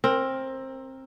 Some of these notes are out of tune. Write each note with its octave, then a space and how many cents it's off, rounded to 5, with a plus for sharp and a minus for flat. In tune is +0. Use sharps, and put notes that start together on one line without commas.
C4 +20 A#4 +0